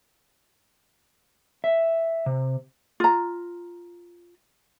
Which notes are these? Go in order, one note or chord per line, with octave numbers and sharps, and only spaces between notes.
E5
C3
F4 A#5